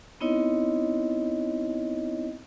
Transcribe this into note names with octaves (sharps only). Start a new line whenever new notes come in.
B3 C4 D#4 E4 C#5 D#5